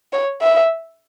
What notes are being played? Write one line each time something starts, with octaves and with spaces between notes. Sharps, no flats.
C#5
E5